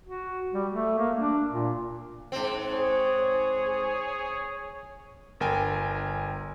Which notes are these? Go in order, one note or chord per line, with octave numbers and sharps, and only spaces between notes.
F#4
G3
A3
A#3
D4
A#2
G#2 C4
G#4 C#5
G1 A#4 G5 G#5